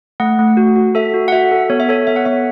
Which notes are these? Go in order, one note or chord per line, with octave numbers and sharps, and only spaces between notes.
A3 F#5
A3
F#4
F#4
A4 E5
F#4
F#5
F#4 E5
A4
B3 C#5
E5
A4 C#5
B3 E5
F#5
B3 E5